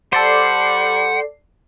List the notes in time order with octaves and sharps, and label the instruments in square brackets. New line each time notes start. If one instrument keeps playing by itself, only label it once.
[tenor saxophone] G3 [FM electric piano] A4 D5 C7 [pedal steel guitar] C5 [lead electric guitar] F#5